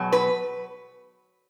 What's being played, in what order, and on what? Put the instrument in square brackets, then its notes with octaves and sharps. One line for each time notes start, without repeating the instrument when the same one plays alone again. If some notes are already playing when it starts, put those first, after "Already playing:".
Already playing: [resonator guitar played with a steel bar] E2 B2 F#3
B4